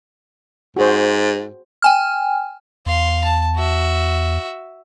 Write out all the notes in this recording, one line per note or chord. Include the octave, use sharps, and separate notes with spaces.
G#2 F#4 G#4 C5
G5 G#5 F6
E2 F5 C6
A5
F#4 E5